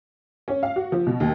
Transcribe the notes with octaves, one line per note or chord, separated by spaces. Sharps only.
C#4
F5
F#4
F3
B2
D#2